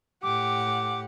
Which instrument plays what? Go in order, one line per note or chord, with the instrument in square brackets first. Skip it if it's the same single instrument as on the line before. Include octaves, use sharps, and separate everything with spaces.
[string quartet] A2 G4 F#5 [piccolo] D6